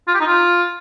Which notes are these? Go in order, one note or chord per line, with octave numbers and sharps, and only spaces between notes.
F4
G4
D#4
F4